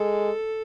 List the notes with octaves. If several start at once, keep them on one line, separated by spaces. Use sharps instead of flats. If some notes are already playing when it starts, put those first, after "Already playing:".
Already playing: G#3 A4